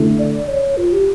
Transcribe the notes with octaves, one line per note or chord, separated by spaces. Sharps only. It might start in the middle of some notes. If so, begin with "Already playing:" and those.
Already playing: D3 A3 E4
D5
C#5
F4
G4